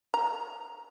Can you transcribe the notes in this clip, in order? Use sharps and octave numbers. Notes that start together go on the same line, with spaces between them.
A#5